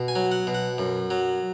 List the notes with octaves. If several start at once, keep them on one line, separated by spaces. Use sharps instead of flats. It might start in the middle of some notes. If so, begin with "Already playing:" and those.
Already playing: B2
G#5
F#3
F#5
B2
F#5
F#2
F#3